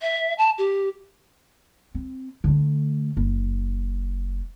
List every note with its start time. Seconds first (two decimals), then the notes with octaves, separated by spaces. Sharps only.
0.02 E5
0.38 A5
0.58 G4
1.95 C4
2.44 D3 A3
3.17 F#1